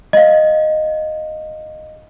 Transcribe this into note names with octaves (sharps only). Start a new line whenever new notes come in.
D#5 F5